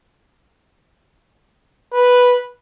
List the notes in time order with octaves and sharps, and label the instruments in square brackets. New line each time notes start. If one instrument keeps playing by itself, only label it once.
[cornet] B4